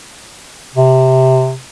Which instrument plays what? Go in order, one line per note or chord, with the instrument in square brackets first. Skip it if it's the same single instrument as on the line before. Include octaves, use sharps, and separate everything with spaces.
[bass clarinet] C3